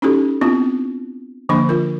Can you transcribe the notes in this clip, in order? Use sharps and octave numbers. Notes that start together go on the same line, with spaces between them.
C#4 D#4 E4 F#4 G4 A4
B3 C4 D4 E4 F4
D3 F3 A#3 D4 C5 B5
F4 A#4